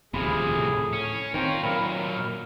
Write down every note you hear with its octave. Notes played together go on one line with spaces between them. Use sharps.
D#1 D2 C3 F3 G#4 B5
A2
C#4
D#3 C4 F4 A#4 C#5
A#2 F#3 A#4 F5 B5 F6